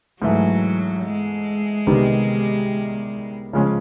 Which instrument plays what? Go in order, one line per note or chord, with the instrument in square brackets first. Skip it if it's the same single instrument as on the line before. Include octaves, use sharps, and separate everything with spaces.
[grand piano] G#2 E3 A3 [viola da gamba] F#3
[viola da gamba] G#3
[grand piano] C3 D#3 G3 B3 D#4
C#3 F3 G#3 C#4